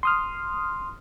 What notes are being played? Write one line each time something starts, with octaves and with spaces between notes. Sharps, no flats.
C6 D#6 F6